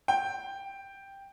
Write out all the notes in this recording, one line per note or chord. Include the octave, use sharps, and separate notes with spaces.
G5